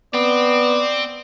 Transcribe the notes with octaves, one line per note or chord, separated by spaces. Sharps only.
B3 C4 D5